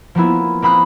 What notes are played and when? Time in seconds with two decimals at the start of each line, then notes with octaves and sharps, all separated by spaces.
0.15 F3 A#3 B3 E4
0.62 A#3 C4 B5 D#6 F#6